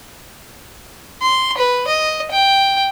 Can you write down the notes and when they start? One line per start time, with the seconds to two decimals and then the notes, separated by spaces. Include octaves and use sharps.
1.22 C6
1.58 B4
1.88 D#5
2.31 G5